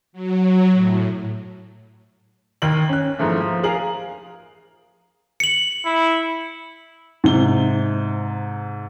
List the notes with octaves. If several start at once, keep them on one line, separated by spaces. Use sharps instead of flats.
F#3
A2
D#2 D#3 G5 F#7
C#4 F#6
G#2 E3 F3 A3 A#3
F3
G#4 A#4 F5 F#7
C#7 F#7
E4
G#2 C3 G7